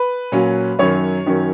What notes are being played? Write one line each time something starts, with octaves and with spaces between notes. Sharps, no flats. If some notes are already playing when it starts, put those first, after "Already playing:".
Already playing: B4
A#2 F#3 C#4
F#2 D#3 F#3 C#4 C#5
F#2 D#3 F#3 C#4